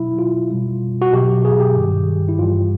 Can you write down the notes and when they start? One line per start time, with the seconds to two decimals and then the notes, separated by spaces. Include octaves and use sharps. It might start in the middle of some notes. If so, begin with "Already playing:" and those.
Already playing: B2 F#3 E4
0.19 F4
0.51 B2 G3
1.02 F#4
1.13 B2 F#3 G4
1.45 G#4
1.60 G4
1.76 G2 D#3 G3
2.29 E4
2.39 G2 E3 G3 F4